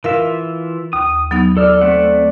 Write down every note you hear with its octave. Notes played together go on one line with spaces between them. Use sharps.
E3 F4 A#4 E5 F5
D#2 D#6
F#3 B3 D#4
A4 D5 E6 F6
A3 C4 F#5